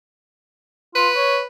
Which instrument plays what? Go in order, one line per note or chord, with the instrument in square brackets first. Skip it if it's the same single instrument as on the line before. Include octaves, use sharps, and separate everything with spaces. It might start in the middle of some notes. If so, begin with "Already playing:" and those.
[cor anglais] F4 [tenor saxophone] B4
[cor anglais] C#5